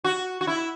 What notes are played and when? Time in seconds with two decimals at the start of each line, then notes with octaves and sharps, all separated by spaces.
0.04 F#4
0.41 F#4
0.47 E4